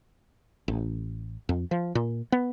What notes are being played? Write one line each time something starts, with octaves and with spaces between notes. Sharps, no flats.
A1
F2
F3
A#2
B3